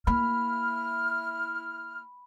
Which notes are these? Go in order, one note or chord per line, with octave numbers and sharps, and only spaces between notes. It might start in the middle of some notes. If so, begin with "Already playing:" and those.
A#3 E4 B5 F6